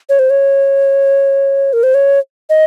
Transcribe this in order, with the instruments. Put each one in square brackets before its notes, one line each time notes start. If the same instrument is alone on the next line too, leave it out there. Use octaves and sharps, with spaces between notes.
[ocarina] C#5
C5
C#5
A#4
C5
C#5
D#5